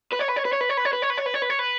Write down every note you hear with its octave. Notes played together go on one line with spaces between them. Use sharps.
B4
C#5
B4
C#5
B4
C#5
B4
C#5
B4
C#5
B4
C#5
B4
C#5
B4
C#5
B4
C#5
B4